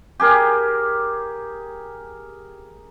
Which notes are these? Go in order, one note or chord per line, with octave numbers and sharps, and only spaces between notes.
G4 G#4 A#4